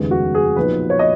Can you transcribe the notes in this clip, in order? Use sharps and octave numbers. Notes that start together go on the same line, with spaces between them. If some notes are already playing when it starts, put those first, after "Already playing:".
Already playing: F1 D#2 C#3 G#3 B3
F#4
G#4
B1 A#2 F3 B3 B4
C#5
D#5